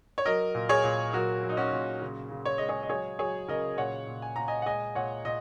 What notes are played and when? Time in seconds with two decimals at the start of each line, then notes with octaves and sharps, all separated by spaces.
0.18 C#5
0.25 F#3 A#4 D#5
0.55 A#2
0.69 G#4 C#5
0.84 A#2
1.13 F#3 F#4 A#4
1.43 F#3
1.49 D#4
1.57 C#4 F#4
1.72 A#2
2.02 C#3
2.31 C#3
2.45 C#5
2.58 G#3 D#5
2.69 G#4 C#5
2.83 D#5
2.89 F#3 G#4 C#5
3.19 F#3 G#4 C#5
3.48 C#3 A#4 D#5
3.78 A#2 C#5 F#5
4.07 A#2
4.22 G#5
4.36 A#2 A#5
4.48 D#5 G#5
4.62 F#5
4.66 G#3 D#5 G#5
4.95 A#2 C#5 F#5
5.25 A#2 D#5